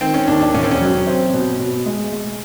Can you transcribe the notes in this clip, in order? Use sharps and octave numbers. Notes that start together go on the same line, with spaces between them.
D#3 C4
C#4
D#2 D4
D4
E1 C#4
C4
C#4
F#3
C4
B2
B2
G#3
G#3